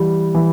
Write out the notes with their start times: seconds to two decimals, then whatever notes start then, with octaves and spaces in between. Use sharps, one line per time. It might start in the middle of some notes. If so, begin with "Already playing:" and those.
Already playing: E3 G3
0.35 E3